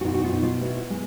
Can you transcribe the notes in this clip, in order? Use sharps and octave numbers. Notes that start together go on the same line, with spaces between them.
F#4
B2 D#4 F4
F#4
D#4 F4
B2
D#4 F4
B3 E4 F#4
G#3